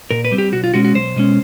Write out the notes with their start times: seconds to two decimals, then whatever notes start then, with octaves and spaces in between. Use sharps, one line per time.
0.11 A#2 A#4
0.25 B4
0.32 G3 C4
0.38 G4
0.53 B1 F#4
0.64 F4
0.74 B2 G#3 C#4 F#4
0.85 F#4
0.95 B1 C5
1.16 B2 G#3 C#4